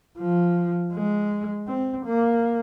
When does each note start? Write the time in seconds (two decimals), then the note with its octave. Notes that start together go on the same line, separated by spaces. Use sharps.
0.19 F3
0.93 G#3
1.68 C4
2.06 A#3